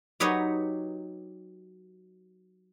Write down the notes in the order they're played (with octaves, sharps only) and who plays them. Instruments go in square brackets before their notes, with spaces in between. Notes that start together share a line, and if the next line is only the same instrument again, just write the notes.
[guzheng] F#3 D#4 G4 B4 C#5 D#5